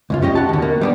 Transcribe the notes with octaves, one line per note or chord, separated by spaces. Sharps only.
C#2 F#2 F4
C#4 G4 D#5
F#4 A5
D#2 D3
A#3
G3 B3 D4